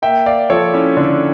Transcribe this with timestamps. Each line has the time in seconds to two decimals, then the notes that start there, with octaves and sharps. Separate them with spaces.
0.02 A#3 E5 G5
0.26 D5 F5
0.50 F3 A4 C#5
0.73 C#4 E4
0.97 D3 D4